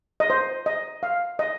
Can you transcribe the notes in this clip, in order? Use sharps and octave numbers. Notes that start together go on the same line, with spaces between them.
D#5
C5
D#5
F5
D#5